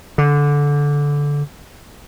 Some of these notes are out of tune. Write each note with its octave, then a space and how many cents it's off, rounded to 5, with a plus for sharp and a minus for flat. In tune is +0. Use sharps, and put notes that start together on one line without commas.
D3 -15